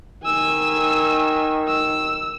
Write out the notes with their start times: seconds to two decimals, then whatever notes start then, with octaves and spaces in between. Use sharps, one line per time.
0.24 D#3 G#5 E6
1.68 E6